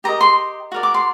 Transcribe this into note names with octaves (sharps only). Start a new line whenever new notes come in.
G4 A#4 D#5 A#5
C6
F#4 A#4 D5
D6
C6